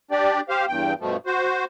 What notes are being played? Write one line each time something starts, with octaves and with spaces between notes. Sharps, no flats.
D4 G4 D5
G4 C5 F5
E2 G2 G5
G2 B2 F3 A3
F#4 C5